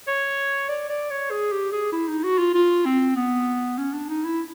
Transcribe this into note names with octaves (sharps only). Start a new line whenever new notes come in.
C#5
D5
D5
C#5
G#4
G4
G#4
E4
D#4
F#4
F4
F4
C4
B3
C#4
D4
D#4
E4